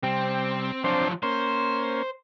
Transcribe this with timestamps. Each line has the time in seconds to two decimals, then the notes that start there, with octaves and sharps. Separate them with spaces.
0.03 C3 G3 C4
0.84 F3 F#3 C4 D4 C5
1.23 A#3 C#4 C5